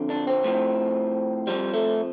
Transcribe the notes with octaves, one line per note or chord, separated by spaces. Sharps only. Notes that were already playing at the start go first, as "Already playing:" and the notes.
Already playing: F2 D3 F3
D4
C4
A2 F3
F2 F3 G3
A3